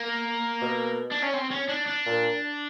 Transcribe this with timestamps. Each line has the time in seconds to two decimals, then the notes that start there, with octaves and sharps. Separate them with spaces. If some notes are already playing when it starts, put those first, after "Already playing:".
Already playing: A#3
0.62 B2
1.12 D4
1.23 C#4
1.34 C4
1.51 C#4
1.69 D4
1.88 D4
2.06 A#2